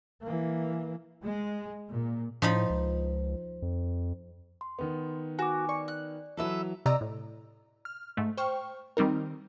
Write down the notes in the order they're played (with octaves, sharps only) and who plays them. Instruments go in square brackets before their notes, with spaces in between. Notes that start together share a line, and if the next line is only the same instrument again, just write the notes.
[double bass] E3 A#3
[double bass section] G#3
A#2
[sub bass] A2 [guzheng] F3 D#4 B5
[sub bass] C#2
F2
[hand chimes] C6
[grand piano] D#3 B3
[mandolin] F#4 [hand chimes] G#5 D6
[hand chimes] D5 [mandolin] C#6
[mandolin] F#6
[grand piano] E3 F#3 [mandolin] A4 B4 E5
[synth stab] C3 D5 D#5 A#5 E6
A2
F6
G#2 A3
C5 G5 C#6 F6
D#3 G3 C4 D#4 A#4